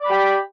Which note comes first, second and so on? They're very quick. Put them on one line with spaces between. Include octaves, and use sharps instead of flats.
D5 B5 G4